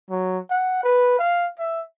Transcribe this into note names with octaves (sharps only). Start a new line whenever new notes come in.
F#3
F#5
B4
F5
E5